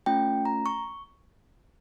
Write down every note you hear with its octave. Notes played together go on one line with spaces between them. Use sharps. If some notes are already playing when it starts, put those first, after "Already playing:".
A3 C#4 F4 G5
A#5
C#6